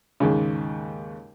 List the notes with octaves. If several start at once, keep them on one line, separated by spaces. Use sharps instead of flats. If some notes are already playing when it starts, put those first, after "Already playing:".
D#2 G#2 C#3